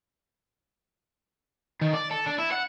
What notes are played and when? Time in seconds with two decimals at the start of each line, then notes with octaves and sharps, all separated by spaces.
1.81 D#3
1.94 D5
2.11 A4
2.26 D4
2.38 E4
2.52 F#5